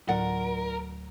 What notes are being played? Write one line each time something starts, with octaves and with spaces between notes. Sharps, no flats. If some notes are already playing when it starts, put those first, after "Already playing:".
D2 A2 F#3 F4 A#4 D5 F#5